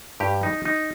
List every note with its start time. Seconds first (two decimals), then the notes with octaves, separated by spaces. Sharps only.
0.20 G2 G4
0.43 D#4
0.65 D#4